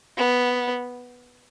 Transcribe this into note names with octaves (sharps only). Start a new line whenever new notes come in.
B3